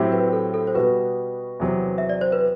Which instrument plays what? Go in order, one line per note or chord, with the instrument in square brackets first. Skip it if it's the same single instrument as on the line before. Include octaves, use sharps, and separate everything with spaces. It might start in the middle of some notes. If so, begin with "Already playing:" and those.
Already playing: [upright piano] A2 F#3 C4 E4 G4
[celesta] B4
A4
A4
C5
[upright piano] B2 G3 B3 F#4 [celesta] B4
[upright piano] E2 C3 F#3 C4
[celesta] E5
D5
C5
B4